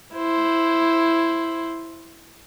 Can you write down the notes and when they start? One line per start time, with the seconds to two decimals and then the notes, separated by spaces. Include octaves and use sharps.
0.14 E4 C5